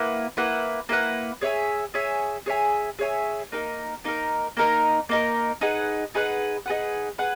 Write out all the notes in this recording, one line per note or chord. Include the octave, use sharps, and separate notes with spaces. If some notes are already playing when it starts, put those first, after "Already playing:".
Already playing: A#3 E4 B4 F#5
A#3 E4 B4 F#5
A#3 E4 B4 F#5
G#4 C#5 E5 G#5
G#4 C#5 E5 G#5
G#4 C#5 E5 G#5
G#4 C#5 E5 G#5
A#3 D#4 A#4
A#3 D#4 A#4
A#3 D#4 A#4
A#3 D#4 A#4
D#4 G#4 B4 F#5
D#4 G#4 B4 F#5
D#4 G#4 B4 F#5
G#4 B4 F#5